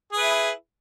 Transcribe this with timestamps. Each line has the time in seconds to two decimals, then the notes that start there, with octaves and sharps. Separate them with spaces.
0.13 G#4
0.17 B4
0.21 E4